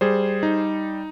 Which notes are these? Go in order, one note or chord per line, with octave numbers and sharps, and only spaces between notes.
G3 G#4 C5
D#4